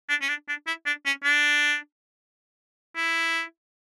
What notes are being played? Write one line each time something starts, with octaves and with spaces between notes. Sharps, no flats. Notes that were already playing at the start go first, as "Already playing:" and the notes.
D4
C#4
D4
D4
E4
D4
C#4
D4
E4